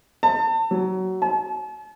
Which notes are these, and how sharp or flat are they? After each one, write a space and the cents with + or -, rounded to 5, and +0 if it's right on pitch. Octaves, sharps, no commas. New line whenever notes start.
A5 +30
F#3 +20
A5 -45